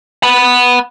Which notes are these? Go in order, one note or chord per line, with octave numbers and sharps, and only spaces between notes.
F#5 B5